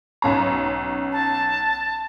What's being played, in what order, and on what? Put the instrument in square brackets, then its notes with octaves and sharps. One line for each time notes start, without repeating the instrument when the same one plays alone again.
[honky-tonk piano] B1 C#4 A#5
[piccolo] A5